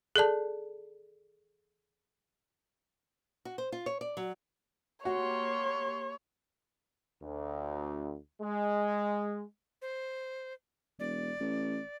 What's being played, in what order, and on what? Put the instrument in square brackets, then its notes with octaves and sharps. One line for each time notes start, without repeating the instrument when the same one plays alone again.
[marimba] G#4 A4 D5 A5
[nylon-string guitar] F#4
C5
F4
C#5
D5
F#3
[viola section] A#3 G4 C6 [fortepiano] F#4 [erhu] C#5
[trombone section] D2
G#3
[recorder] C5
[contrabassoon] E1 [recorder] D5
[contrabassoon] A1